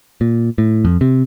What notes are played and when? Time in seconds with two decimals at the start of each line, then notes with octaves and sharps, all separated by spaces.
0.21 A#2
0.58 A2
0.85 F2
1.01 C3